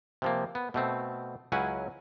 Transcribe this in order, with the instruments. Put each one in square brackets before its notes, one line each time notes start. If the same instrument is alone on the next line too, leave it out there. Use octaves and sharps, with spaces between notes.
[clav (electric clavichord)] C3 F3 A#3
B3
B2 A3 C4
C#2 F#3 C#4 E4 F#5 G#5